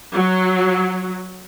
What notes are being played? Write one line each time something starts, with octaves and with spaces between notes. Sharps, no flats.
F#3